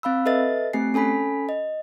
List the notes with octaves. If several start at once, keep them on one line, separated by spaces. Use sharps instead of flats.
C4 F5 B5 E6
A4 B4 D#5 E5 A6
A3 C4 G4 G#5 C7
C#4 A4 G#5 B5 B6
D#5